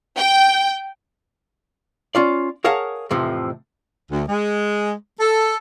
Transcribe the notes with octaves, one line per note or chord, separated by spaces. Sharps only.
G5
C#4 F4 D5
G#4 A#4 C#5 F5 F#5 A5
F2 A2 C3 E3 F3
D2
G#3
A4